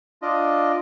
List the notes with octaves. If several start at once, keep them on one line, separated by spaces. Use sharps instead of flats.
D4 F4 D#5